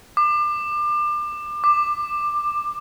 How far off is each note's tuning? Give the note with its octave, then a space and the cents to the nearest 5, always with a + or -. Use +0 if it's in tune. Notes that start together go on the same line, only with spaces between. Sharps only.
D6 +30
D6 +15